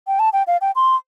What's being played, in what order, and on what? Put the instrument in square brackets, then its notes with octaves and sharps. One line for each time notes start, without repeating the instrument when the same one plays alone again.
[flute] G5
A5
G5
F5
G5
C6